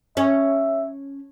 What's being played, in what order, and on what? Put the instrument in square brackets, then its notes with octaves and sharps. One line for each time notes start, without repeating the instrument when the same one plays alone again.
[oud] C#4 [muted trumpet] E5